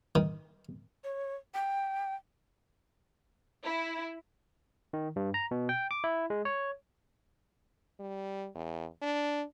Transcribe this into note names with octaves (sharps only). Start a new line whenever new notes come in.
D#3
C#5
G5
E4
D#3
G2
A#5
B2
G5
D6
E4
G#3
C#5
G3
E2
D4